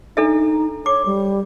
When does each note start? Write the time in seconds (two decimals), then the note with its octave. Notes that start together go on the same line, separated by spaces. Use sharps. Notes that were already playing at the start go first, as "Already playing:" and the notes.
0.17 D4 D#4 A4 E5
0.86 C#5 D6
1.06 G3